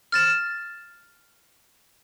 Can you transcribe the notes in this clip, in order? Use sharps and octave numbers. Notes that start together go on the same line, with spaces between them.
F6 A6 E7